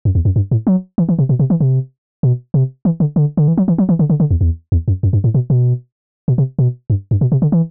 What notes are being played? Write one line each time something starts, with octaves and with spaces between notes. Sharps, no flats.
F#2
E2
F#2
G2
A2
F#3
E3
E3
C3
B2
C3
E3
C3
B2
C3
E3
D3
D3
D3
E3
F#3
E3
F#3
E3
D3
D3
D3
E2
E2
E2
F#2
F#2
G2
A2
B2
B2
B2
C3
B2
G2
G2
B2
C3
D3
E3